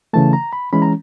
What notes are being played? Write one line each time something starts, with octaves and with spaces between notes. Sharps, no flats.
C#3 E3 A3 A5
A#5
B5
E3 G#3 C#4 B5
A#5